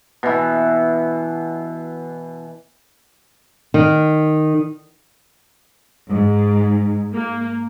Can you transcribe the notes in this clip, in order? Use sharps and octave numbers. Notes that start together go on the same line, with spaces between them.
B2 E3
D#3
G#2
A#3